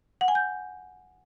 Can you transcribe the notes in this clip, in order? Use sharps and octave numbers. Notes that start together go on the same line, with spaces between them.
F#5
G#5
G6